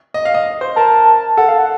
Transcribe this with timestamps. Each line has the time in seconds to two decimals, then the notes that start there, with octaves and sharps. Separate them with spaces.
0.14 D#5
0.25 F5
0.34 D#5
0.61 C5
0.76 A#4 A5
1.37 A4 F#5
1.48 F5
1.58 F#5